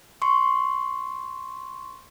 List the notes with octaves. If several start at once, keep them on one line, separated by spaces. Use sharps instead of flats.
C6 C#6